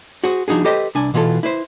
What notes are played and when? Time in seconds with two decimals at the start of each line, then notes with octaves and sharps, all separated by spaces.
0.24 F#4 G#4 C5
0.48 F3 D4 D#4 F#4 G#4
0.65 G4 A4 B4 C5 D#5 G5
0.95 C2 D4 G#5
1.14 B2 E3 F4 F#4 A4
1.43 E4 B4 C5